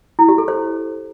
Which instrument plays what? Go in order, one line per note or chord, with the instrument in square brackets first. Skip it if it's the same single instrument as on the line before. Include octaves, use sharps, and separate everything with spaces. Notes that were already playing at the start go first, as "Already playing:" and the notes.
[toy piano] E4
G4
A4
C5